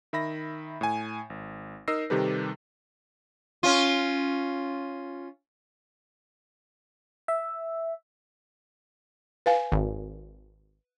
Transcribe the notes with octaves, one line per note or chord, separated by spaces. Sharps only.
D#3 E5 B5 A#6
A2 G#5
G#1
D#4 A#4 D#5 E6 A#6 C7
C3 D#3 G3 G4 A4 B4
C#4 F4
E5
B4 F5 G#5
G#1